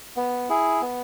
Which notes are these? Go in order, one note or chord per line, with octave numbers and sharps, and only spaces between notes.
B3
E4 G#4
B3